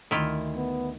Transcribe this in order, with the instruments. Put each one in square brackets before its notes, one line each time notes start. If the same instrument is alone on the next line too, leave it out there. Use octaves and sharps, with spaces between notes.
[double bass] D2 [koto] D#3 E4 F4
[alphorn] B3